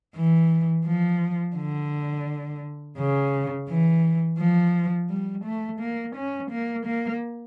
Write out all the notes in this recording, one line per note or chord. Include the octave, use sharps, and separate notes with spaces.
E3
F3
D3
C#3
E3
F3
G3
A3
A#3
C#4
A#3
A#3